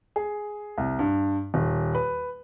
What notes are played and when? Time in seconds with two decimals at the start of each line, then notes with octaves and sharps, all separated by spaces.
0.16 G#4
0.78 C2
0.99 G2
1.54 D#1
1.95 B4